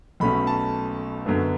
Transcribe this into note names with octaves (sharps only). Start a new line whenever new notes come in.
B1 B2 A3 C#4 B5
A5
F#2 D3 F#3 B3